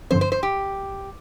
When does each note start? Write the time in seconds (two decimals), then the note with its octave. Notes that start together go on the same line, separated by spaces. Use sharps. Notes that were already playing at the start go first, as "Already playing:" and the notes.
0.11 G2 D3 F3 C4 C5
0.21 C5
0.32 C5
0.43 G4